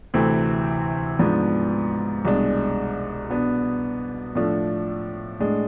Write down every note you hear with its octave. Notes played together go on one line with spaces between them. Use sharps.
D2 C3 E3 A3 C4
G#2 F3 B3 D4
C2 B2 G#3 D4
B2 B3 D4
A2 F3 A3 D4
A2 G#3 D4